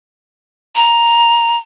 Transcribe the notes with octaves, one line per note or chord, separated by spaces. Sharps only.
A#5